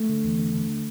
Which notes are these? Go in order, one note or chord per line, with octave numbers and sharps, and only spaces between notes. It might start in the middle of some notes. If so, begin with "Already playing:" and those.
Already playing: A3
D3
E2
D3
D3